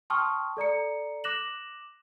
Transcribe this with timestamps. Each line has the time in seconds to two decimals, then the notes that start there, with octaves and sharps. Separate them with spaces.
0.10 G5 A5 C6 C#6 D#6 F6
0.57 A4 D5 A#5 C#7
1.24 D6 F#6 A#6 E7 F#7